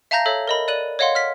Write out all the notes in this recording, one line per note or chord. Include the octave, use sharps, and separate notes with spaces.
E5 F5 A5 A#5 G6 A#6
A4 C#5 E5
A#4 D#5 B5
D5 F#6 D#7 F#7
C#5 D#5 F5 F#5 C6
F6 B6